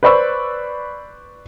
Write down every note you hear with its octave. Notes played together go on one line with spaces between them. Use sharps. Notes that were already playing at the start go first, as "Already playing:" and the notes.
B4 C5 D5 B5 C#6 E6